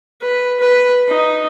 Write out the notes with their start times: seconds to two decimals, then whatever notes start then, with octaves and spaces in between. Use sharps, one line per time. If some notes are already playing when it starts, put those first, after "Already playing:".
0.22 B4
0.60 B4
1.08 D#4